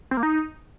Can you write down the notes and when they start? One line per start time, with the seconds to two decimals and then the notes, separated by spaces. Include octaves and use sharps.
0.11 C4
0.17 A#3
0.23 D#4